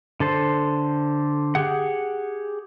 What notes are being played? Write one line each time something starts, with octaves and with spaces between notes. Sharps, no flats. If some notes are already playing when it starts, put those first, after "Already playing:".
D3 A4 C5
G4 G#4 F#5